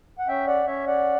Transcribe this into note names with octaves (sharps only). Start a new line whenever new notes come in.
F#5
C#4 E5 G5
D5 F#5
C#4 C#5 E5
D5 F#5